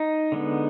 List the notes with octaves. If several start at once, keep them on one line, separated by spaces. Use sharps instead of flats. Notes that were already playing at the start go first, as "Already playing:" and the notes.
Already playing: D#4
D3 G#3 B3